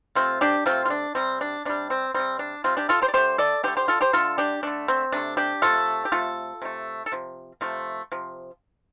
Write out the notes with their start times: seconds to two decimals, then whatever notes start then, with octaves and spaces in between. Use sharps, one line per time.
0.15 C3 A3 C4 F4
0.41 D4 G4
0.66 C3 A3 C4 F4
0.85 F4
0.90 D4
1.15 C3 G3 C4
1.41 D4
1.65 C3 G3 D4
1.90 C4
2.14 C3 G3 C4
2.39 D4
2.64 C3 G3 C4 F4
2.77 D4 G4
2.89 F4 A4
3.02 G4 C5
3.08 D5
3.13 D3 A3 G4 C5
3.38 A4 D5
3.63 D3 G4 C5
3.68 A3
3.77 G4 C5
3.88 F4 A4
4.01 G4 C5
4.13 D3 A3 F4 A4
4.38 D4 G4
4.63 D3 A3 D4
4.88 C4
5.12 C3 A3 D4
5.37 D4 G4
5.62 C3 A3 F4 A4
6.05 G4
6.12 C3 A3 F4 A4
6.62 C3 A3
7.06 A4
7.12 C3 F3
7.61 C3 F3 A3
8.12 C3 F3